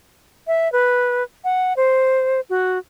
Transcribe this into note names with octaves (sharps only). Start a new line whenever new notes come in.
E5
B4
F#5
C5
F#4